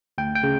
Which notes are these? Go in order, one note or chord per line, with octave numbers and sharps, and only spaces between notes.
D2 G5
G5
C#3